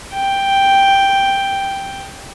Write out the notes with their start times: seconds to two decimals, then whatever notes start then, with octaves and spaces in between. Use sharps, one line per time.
0.14 G5